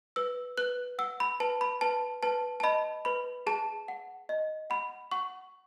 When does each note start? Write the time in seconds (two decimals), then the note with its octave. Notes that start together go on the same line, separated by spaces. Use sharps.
0.16 B4 E6
0.57 B4 F#6
0.99 F#5 E6
1.20 B5
1.40 B4 A5
1.61 B5
1.81 B4 A5
2.23 B4 A5
2.60 A5
2.63 D#5 B5
3.05 B4 B5
3.47 G#4 A5
3.88 F#5
4.29 D#5
4.70 F#5 B5
5.11 F#5 C#6